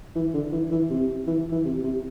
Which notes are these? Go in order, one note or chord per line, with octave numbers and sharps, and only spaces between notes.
E3
D3
E3
E3
C3
E3
E3
C3
C3